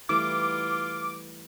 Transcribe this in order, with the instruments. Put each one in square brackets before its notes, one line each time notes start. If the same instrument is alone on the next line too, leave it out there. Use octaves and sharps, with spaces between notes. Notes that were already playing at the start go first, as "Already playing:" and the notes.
[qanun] E3 G3 A3 [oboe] F4 [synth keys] D6